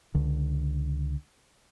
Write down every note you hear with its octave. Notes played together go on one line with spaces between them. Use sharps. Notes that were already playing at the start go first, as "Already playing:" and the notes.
C#2 D3